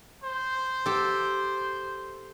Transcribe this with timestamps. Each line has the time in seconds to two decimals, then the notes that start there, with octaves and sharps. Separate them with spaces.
0.24 C5
0.86 G4 A4